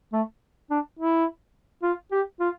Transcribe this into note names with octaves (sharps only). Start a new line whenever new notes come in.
A3
D4
E4
F4
G4
F4